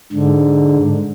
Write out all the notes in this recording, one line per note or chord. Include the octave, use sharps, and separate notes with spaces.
G#2 D3